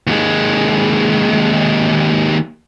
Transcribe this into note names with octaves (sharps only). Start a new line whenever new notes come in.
D#2 G#3